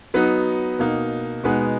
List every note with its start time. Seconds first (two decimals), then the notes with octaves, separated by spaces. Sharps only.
0.14 F#3 B3 D#4
0.79 B2 A#3 D#4
1.44 B2 G#3 B3 D#4